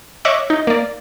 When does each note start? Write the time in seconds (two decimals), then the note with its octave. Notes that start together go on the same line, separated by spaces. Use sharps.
0.25 C#5 D#5 E5 C#6 D6 F#6
0.50 D#4
0.67 A#3 D5